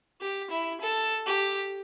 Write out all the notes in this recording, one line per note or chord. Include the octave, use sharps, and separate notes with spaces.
G4
E4
A4
G4